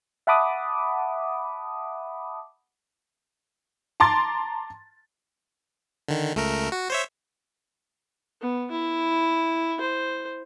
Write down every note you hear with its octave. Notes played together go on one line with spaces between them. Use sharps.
E5 F#5 A5 B5 D6 D#6
A5 A#5 C6 D6 A6
D3 D#3
C#2 A3 A#4
F#4
C5 C#5 E5
B3
E4
C5